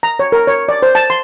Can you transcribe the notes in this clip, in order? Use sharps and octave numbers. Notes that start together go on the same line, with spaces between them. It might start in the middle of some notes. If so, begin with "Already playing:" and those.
A#5
C#5
A#4
C#5
D5
C5
A5
C6